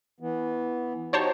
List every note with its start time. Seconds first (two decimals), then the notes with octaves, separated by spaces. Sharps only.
0.20 E3 B3
1.13 D#4 F#4 G4 C5 C#5 A5